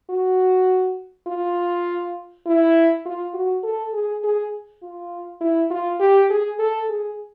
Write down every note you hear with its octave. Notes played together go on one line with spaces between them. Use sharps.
F#4
F4
E4
F4
F#4
A4
G#4
G#4
F4
E4
F4
G4
G#4
A4
G#4